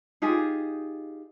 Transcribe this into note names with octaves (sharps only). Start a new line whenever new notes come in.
D#4 F4 G4 G#4